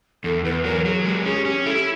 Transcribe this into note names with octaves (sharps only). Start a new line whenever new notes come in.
E2 A4
E2 B4
F#3 A#4
F#3 G#4
G#3 G4
C#4 G#4
C#4 G4
E4 A4